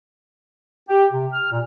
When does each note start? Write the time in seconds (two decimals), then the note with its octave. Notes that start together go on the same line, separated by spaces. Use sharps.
0.89 G4
1.12 C3
1.33 F6
1.51 A#2